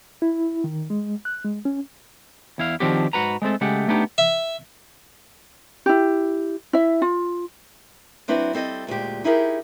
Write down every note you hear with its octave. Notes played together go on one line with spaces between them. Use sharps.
E4
D#3
G#3
F#6
G#3
C#4
E2 E4 F5
D#3 F3 C4 D4 F#4 G4
G#2 F#4 B4 A#5
G#3 A3 C4 A4
C#3 G#3 A3 G4 F#5
A3 B3 D4 D#4 G4
E5
E4 G4
E4 E5
F4
F#3 C4 D4 E4 B4
G3 C4 A4 D#5
D2 A#2 G#3 G4
D#4 E4 G4 G#4 A#4